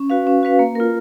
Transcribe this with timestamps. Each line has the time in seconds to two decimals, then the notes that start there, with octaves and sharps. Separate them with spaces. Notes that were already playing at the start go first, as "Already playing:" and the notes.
Already playing: C#4
0.10 F#4 B4 F5
0.27 C#4
0.43 F#4 B4 F5
0.59 A#3
0.75 F4 A#4